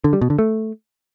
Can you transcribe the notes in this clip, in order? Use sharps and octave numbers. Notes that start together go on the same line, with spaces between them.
D3
G3
B2
D3
A3